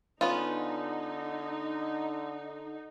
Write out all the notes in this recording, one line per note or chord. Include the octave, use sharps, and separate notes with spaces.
D3 B3 C#4 D#4 F4